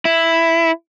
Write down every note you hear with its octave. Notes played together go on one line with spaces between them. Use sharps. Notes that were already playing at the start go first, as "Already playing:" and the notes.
E4